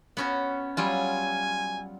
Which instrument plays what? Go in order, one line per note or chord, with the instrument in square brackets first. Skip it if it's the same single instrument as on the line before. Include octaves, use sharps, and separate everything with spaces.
[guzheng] B3 C#4 F#4
[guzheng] F#3 G3 F4 [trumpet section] G#5